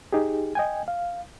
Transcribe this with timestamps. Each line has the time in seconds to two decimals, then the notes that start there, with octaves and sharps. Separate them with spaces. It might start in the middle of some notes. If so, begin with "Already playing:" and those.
0.13 D#4 G4 G#4
0.55 D#5 G5 G#5
0.88 F5